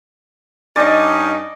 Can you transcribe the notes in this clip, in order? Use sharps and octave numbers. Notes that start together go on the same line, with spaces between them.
G2 C#4 D#4 D5 D#5